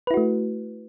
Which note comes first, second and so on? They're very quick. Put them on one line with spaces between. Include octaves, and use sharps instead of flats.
B4 E4 F#4 A3